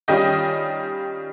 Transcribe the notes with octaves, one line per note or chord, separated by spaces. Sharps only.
D#3 G3 C#4 F4 D#5 G5